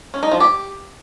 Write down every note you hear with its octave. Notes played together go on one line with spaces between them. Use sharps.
C#4
D#4
F3
G4